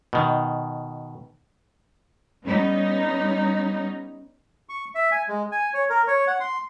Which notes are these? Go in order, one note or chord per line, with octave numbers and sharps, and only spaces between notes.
B2 D#3
G3 B3 C#4 D#4
C#6
E5
G#5
G#3
G#5
C#5
A#4
C#5
F#5
C6